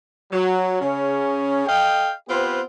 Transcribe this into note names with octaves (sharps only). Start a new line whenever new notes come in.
F#3
C#3 C#4
A4 D#5 F5 G5
B3 C4 F4 G4 B4 C5